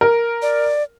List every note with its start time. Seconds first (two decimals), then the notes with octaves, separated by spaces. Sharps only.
0.01 A#4
0.42 D5